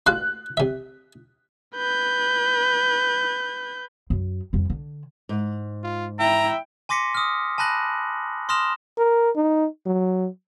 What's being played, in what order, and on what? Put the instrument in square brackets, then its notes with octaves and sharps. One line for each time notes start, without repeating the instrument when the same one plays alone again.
[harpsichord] F#4 F5 C6 [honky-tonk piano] F#6
[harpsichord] C3 E5
[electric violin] B4 G6
[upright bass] F#2
F2 G3
D3
[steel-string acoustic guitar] G#2
[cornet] F4
[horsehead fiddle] E4 G5 [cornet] E5 [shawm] A#5
[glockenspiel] G#5 C6 D6 A#6 B6 C#7
D#6 F6
G#5 A5 B5 F#6 A#6 F#7
C6 D#6 F6 A#6 E7 F7
[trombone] A#4
D#4
F#3